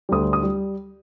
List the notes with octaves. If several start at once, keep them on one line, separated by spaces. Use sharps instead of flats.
D2 D3 G3 D#6
D#6
G3